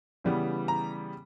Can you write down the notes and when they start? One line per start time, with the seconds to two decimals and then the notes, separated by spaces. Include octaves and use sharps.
0.24 C#3 E3 G3 B3
0.68 A#5